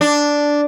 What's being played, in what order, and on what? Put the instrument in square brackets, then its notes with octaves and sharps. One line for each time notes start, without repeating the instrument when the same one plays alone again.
[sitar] D4